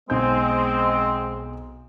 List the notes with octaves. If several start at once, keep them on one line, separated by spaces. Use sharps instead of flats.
B1 G#3 C4 D#4 G6